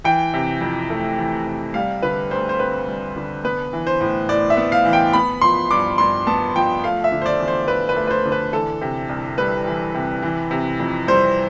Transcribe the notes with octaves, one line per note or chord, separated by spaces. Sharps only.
E3 G5
C3
F2
A3
E3
C3
G3 F5
D3 B4
D2 C5
C5
C4 B4
G3
D3
B3 B4
E3
C5
A2
A2 D5
E5
B3
F5
E3
G5
B3 B5
F3 C6
G2 D6
G2 C6
B3 A5
F3 G5
A3 F5
E5
D3
C5
D5
E2
C5
E2 B4
B4
A3
B4
C5
D3
B4
E3 A4
C3
C2
G3 B4
E3
C3
E3
C3
F2
G3 C5